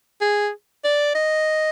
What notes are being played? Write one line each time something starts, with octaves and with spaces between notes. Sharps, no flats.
G#4
D5
D#5